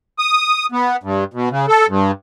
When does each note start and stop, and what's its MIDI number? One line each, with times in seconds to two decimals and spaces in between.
0.19 0.66 87
0.72 0.96 59
1.03 1.24 43
1.34 1.49 47
1.51 1.66 49
1.68 1.86 69
1.89 2.11 43